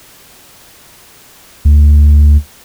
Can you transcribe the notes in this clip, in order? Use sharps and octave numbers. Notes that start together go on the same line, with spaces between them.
D2